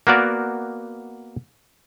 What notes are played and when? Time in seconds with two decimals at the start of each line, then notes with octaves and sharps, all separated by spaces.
0.07 A#3 B3 F#4 A#4 D5